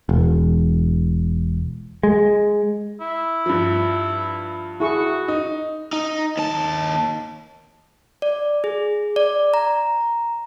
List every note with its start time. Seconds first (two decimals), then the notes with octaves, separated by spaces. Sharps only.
0.09 E1
2.03 G#3
3.01 E4
3.46 G2 F3
4.80 E4 F#4 G#4 C#6
5.28 D#4
5.93 D#4
6.37 D#2 A5
8.22 D5
8.64 G#4
9.16 D5
9.54 A#5